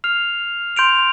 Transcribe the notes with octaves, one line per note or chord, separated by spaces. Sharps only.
F6 C7 F7
C6 G6 D7 F7